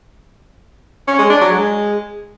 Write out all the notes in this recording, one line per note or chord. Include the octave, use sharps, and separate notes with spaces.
C#4
G#3
D4
F#3
G#3